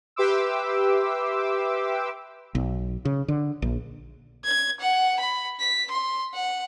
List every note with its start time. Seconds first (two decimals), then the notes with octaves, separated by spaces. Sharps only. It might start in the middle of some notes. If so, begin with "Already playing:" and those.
0.16 G4 B4 E5 C6 D6 E6
2.55 B1
3.05 C#3
3.28 D3
3.62 A#1
4.44 G#6
4.80 F#5
5.20 B5
5.60 B6
5.91 C6
6.34 F#5